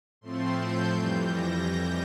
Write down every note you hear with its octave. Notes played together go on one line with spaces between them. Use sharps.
A2 F3 A3 C4 C6
G6
F2 E3 G3
A#6